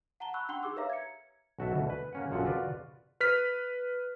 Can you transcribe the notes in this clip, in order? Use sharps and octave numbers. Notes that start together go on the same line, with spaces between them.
F#5 A5 A#5 G7
B5 C#6 E6 F#6
D4 F#5 G5 C6 G7
D#4 G4 G#4 D6 E6
A#4 B4 C#5 E5 F5 A#5
G#6 C#7
B1 F#4 A4 E5
D2 B2
B4
A#3 C#4 F#5
A#1 F#2 A#2 F3 A4 F#5
F4 F#4 B4 D5
B4 F6 B6